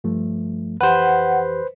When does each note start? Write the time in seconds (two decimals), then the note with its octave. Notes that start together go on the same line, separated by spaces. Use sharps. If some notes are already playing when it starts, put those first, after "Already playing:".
0.04 G2 F3 A3
0.81 F2 E3 G4 B4 C5 F#5